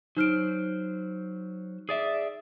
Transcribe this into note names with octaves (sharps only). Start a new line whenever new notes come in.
F#3 D#4 C5 F6 D7
G#4 D5 E5